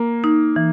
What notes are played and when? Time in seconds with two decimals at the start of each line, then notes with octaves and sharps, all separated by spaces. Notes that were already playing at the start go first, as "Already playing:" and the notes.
Already playing: A#3
0.24 D#4
0.56 E3